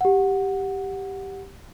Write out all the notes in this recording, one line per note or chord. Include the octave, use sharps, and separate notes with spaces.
G4 F#5